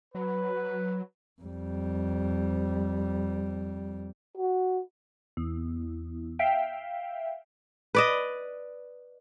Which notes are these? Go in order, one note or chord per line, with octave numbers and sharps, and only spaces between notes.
F#3 B4
F2 G3
F#4
E2
E5 F5 G5
B4 D5 D#5